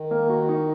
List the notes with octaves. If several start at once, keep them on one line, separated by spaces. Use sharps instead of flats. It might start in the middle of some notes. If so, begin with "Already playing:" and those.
Already playing: D#3
A#3
F#4
D#4